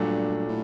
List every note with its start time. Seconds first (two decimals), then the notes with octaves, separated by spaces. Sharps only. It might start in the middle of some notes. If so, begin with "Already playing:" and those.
Already playing: G2 A#2 F#3 A3 D4 A4
0.38 G2
0.48 A2